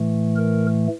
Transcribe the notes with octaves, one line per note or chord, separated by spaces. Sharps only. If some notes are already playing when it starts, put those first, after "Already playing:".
Already playing: A2 E3 A3
A#4